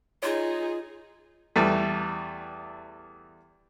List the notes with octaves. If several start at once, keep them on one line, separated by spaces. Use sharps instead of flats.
D#4 F4 G#4 C#5
E2 G3 A3